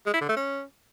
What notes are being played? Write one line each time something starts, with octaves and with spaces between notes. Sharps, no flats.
G#3
E4
D3
A3
C#4